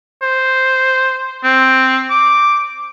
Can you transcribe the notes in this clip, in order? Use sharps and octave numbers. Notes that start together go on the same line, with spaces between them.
C5
C4
D6